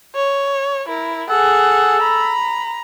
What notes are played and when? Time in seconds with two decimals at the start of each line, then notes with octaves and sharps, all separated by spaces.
0.15 C#5
0.88 E4 A#4
1.30 G#4 A4 F#5
2.02 A#5 B5